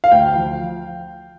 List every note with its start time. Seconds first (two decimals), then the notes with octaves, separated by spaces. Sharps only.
0.04 F5
0.12 D2 G5
0.36 F3